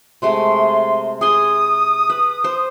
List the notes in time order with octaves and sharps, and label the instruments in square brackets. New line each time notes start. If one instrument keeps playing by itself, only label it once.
[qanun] C3 G#3 A3 [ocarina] C6
[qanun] G#4 C6 [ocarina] D#6
[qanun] B4
C5